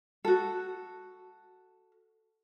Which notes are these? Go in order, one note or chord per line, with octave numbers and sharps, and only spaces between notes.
F#4 A4